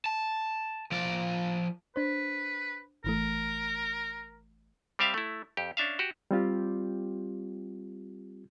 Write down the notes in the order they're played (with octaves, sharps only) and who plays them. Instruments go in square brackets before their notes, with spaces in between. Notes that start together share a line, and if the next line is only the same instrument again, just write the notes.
[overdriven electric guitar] A5
F3 D5
[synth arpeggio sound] D4 C5 [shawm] B4
[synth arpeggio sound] G#1 E3 A3 [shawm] A#4
[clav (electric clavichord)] G3 C4 G4 E5 F5
A3 E4
F2 G4
C#4 D4 E5 F5
F#4 G4
[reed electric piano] G3 C4 F4 G4